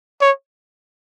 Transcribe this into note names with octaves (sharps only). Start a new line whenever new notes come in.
C#5